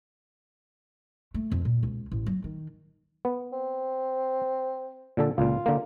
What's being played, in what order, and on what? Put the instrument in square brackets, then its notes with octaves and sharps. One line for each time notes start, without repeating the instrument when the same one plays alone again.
[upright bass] A3
F2
A#2
C#2
A1
F#3
D#3
[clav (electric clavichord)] B3
[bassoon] C4
[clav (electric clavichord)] A#2 D3 A4
[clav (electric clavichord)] C#2 A#2 [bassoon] F4
[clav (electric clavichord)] D3 A#3